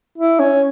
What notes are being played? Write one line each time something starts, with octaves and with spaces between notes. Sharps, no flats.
E4
C#4